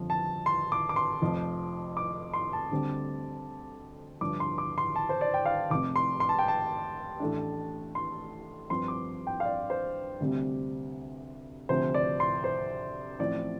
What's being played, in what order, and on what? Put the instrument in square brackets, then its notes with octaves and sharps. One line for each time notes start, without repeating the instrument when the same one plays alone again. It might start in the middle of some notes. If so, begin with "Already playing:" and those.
Already playing: [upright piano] G1 F2 F3
A5
C6
D6
D6
C6
F1 F2 F3
D6
C6
A5
D2 D3 G3 C4
G1 G2 F3 D4 D6
C6
D6
C6
A5
C5
D5
G5
F5
F1 F2 C3 D6
C6
C6
A5
G5
A5
A1 A2 A3 D4
C6
G2 F3 C4 C6
D6
G5
F5
D5
C5
D2 C3 G3 C4
D2 C3 F3 C5
D5
C6
C5
A1 A2 F3 C4 D5